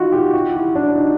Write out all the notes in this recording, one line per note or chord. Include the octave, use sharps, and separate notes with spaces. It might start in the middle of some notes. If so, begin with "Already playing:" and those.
Already playing: D#4 F4 F#4
G4
F#4
E4
D4
D#4